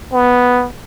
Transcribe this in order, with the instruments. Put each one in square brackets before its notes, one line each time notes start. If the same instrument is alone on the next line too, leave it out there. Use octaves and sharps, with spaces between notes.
[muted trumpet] B3